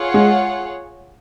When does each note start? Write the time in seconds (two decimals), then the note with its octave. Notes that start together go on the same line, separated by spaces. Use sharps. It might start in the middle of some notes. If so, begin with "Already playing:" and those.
Already playing: F4 G#4 C#5 F#5
0.14 G#3